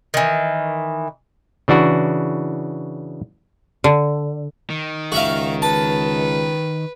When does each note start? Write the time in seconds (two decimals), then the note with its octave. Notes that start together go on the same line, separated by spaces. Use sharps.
0.14 D#3 E3
1.68 C#3 E3 D4 F#4
3.84 D3
4.70 D#3
5.12 C#2 F#4 E5 F5
5.62 B4 A5